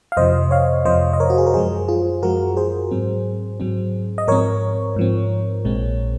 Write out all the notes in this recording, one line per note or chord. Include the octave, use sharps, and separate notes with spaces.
F5
F2 C3 F3 C5 D#5
C#5 F5
F2 C3 F3 C5 D#5
D#5
A#4 C#5
F#4
G#4
A#4
F#2 F3 G#3 G#4 C5
F4 G#4
F#2 F3 G#3 F#4 A#4
G#4 C5
G#2 F#3 C4
G#2 F#3 C4
D#5
G#2 F3 C4 A#4 C#5
G#2 F3 C4
A#1 A#2 G#3 C4